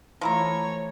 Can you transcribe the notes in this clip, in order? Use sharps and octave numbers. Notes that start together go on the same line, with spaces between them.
E3 F3 A3 E4 C#5 A#5